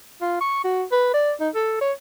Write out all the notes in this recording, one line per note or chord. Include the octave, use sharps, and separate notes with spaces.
F4
C#6
F#4
B4
D5
D#4
A4
C#5